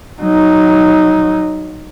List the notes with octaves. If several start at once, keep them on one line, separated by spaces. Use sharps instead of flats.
F#3 D#4